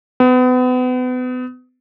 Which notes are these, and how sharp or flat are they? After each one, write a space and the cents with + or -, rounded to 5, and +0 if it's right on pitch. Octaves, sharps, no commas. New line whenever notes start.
B3 +35